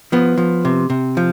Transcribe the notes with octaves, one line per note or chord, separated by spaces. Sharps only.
F3 B3
F3
C3
C3
F3